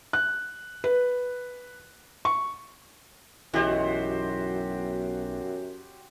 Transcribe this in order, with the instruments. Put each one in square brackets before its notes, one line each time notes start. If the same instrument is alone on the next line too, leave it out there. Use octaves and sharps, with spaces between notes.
[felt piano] F#6
B4
C#6
[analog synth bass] B1 [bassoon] F#2 [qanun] E3 D#5 [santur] F#4 G4 C5